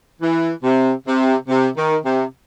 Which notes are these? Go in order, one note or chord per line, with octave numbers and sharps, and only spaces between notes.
E3
C3
C3
C3
D#3
C3